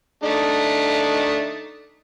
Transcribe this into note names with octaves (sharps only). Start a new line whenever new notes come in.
A3 D4 D#4